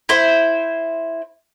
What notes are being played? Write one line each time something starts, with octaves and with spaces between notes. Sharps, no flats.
E4 C5